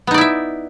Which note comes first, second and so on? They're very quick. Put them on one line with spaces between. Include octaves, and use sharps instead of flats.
B3 D#4 D5 E4 E5